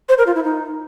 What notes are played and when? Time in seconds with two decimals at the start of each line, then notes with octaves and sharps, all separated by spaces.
0.09 C5
0.18 A#4
0.27 F4
0.35 E4
0.44 D#4